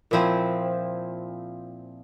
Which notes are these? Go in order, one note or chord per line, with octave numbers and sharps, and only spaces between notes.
A#2 F3 C4 E4